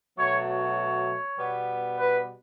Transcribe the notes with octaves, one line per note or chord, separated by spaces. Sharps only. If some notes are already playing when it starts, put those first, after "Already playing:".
B2 F#3 A3 C#5
C#5
B2 G3 B3
B4